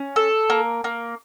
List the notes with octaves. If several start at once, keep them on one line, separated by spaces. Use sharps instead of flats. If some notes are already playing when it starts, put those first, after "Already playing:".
Already playing: C#4
A4
A#3
A#3